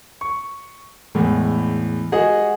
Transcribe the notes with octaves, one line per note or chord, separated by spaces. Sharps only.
C#6
E2 A2 G#3
F#4 G#4 D#5 F#5